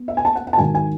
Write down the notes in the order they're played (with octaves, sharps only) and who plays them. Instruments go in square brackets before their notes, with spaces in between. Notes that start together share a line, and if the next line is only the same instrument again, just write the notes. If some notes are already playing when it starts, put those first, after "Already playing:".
Already playing: [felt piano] B3
E5
G#5
A5
F#5
F#5
A5
G#1 G#2 D#3 F#3 G#5
G#5